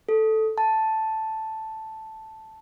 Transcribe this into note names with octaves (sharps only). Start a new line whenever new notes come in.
A4
A5